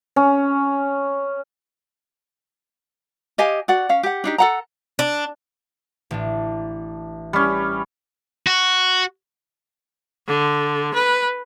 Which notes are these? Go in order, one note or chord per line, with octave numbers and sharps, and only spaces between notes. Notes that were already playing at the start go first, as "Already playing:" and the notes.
C#4
G4 D#5 F5 G#5
F#4 D5 F#5
C#4 F5
G4 F#5
D4 D#4 G4
A4 F#5 A#5
D4
A1 D4
G3 C#4
F#4
D3
B4